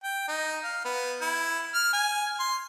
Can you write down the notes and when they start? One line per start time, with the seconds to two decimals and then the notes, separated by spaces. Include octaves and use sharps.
0.03 G5
0.28 D#4
0.64 F5
0.85 B3
1.21 E4
1.74 F6
1.93 G#5
2.40 C6